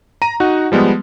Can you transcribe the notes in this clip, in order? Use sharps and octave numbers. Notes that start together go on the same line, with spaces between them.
A#5 D#7
D#4 F#4 F#5
F3 G3 G#3 B3